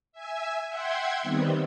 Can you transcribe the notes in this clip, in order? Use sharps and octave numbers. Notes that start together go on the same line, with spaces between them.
E5 G#5 E6
E5 F#5 G5 C6 G#6
D#3 G3 B3 C4